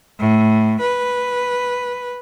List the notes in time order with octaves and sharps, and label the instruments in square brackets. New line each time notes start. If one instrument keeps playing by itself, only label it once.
[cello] A2
B4